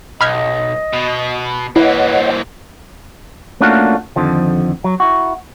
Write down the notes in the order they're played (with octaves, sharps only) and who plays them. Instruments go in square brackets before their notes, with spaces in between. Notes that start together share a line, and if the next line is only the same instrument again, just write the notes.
[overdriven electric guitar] B1 [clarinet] D#5 [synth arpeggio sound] B5 F6 G#6
[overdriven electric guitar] B2
[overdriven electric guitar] E3 A#3 [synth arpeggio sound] E4 [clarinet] B4 [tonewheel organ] C#5 D#5 F#5
[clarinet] C5
[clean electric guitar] A3 A#3 C#4 D4 F4 F#4
F2 D3 D#3 F3
F#3
E4 F#4